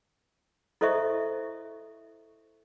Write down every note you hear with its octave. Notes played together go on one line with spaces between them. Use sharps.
E4 A4 C5 D#5 E5 C#6